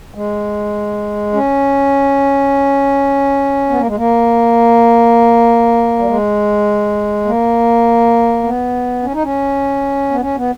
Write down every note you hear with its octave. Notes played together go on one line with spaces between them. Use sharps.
G#3
C#4
B3
A#3
G#3
A#3
G3
G#3
A#3
B3
C#4
D#4
C#4
B3
C#4
B3